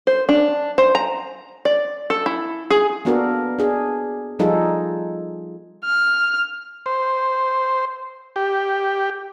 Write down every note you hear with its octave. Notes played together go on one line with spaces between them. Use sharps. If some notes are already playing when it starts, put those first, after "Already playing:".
C5
D4
C5
A#5
D5
A4
E4
G#4
A#3 B3 D4 F#4 A4 A#4
D4 G#4
F3 G3 D#4 F4 G#4 A4
F6
C5
G4